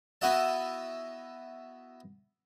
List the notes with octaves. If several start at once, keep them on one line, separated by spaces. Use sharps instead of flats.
B3 E4 F#4 D#5 E5 A5